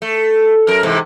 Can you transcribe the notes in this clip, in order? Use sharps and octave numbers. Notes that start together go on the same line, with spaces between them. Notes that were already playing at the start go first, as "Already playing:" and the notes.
A3
F#2 A#4
G#2 C3 E3